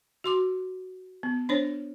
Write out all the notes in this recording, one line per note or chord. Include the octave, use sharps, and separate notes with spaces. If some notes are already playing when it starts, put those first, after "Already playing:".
F#4 C6 D6
B3
D4 C5 C#5